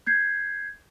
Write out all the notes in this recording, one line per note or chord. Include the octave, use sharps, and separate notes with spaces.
G6 G#6 C7